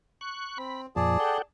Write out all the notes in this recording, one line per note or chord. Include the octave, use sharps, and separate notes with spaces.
C#6 F#6
C4 B5
F2 A#2 F3 G#4 D5 A5
A4 F#5 G5